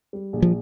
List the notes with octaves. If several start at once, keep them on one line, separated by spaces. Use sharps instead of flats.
G3
A#1
F3